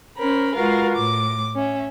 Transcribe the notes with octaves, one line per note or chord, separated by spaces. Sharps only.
C#4 A#4 C5 B5
G#3 F4 F#4 A#4 B4 F5
A2 D6
C#4 E5